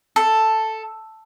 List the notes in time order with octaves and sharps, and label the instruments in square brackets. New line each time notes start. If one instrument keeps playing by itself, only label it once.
[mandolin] A4